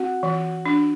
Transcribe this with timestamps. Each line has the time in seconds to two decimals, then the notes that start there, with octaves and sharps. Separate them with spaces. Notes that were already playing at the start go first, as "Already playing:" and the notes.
Already playing: C4 F#4
0.23 E3
0.66 D4